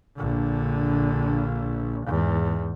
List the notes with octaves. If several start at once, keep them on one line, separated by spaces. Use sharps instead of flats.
A#1 D3
E2 G#2